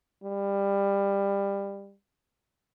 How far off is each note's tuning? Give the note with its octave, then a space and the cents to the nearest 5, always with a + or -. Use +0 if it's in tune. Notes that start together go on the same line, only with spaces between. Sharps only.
G3 +20